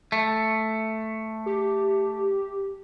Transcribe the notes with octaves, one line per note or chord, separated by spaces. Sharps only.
A3
G4